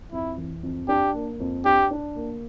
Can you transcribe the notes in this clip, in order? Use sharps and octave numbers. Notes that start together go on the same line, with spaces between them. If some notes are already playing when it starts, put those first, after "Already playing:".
F2 E4
E3
F2
D4 G4
A#3
F2
D4 G4
D4
A#3